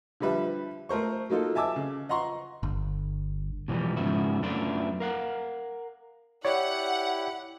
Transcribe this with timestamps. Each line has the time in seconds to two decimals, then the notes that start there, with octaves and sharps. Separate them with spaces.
0.20 D3 F3 G3 B4 E5
0.89 A3 A#4 C5 C#6
1.30 F#3 A#3 D#4 F4 A4
1.55 E5 G#5 A5 D6 E6
1.76 C#3
2.09 D#5 F#5 A#5 C6 C#6
2.63 G1
3.68 B2 E3 F3 G3
3.96 G#2 C#3 F3 B3 E4 F#4
4.42 F#2 A3 B3 D4 E4 F4
5.00 A#4 F5 F#5
6.45 E4 G4 C#5 D5 F#5